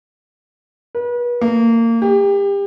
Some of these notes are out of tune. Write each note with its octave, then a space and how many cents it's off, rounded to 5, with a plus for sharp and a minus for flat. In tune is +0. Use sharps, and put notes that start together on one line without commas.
B4 -35
A#3 -25
G4 +30